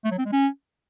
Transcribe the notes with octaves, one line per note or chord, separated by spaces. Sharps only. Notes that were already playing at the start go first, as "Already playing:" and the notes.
A3
F#3
C4
G#3
C#4